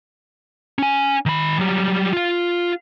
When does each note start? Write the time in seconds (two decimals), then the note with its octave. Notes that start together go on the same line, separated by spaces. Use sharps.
0.79 C#4 G#5
1.26 D#3 B5
1.59 F#3 G3
2.13 F4 F5